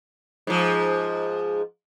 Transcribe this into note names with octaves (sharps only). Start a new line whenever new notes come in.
G#2 F3